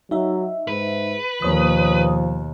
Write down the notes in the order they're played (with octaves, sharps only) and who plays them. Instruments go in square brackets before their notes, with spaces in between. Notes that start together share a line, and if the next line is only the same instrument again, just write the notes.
[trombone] F#3 [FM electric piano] D#4 E5
[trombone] G#2 [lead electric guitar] B4
[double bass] D#2 B2 [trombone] F3 [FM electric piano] A#3 C#5 D#6